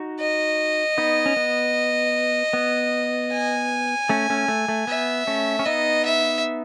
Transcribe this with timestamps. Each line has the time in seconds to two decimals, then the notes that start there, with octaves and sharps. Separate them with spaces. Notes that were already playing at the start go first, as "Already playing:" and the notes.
Already playing: D#4 F#4
0.19 D#5
0.98 B3 D#4
1.26 C#4
1.37 B3
2.53 B3
3.32 G#5
4.09 A3 C#4
4.30 A3 C#4
4.48 A3
4.68 A3
4.87 B3 E5
5.27 A3 C#4
5.59 C#4
5.66 B3 D#4 D#5
6.05 E5